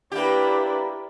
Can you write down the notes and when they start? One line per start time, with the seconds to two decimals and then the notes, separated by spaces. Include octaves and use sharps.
0.12 A#3 D4 E4 G4 B4